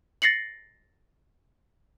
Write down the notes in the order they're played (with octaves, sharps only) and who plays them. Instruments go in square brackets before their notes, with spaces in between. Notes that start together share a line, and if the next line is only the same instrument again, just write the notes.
[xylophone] A6 A#6 C7 C#7 F#7